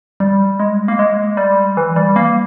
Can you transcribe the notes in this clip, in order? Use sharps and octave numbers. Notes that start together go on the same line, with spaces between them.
G3
G#3
A#3
G#3
G3
E3
G3
A#3